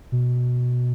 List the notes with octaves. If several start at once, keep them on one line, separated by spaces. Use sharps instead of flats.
B2